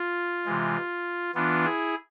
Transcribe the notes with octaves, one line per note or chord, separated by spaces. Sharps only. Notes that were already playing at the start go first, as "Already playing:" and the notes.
Already playing: F4
C3 E3 G#3
E3 B3 D4 F4
E4 G#4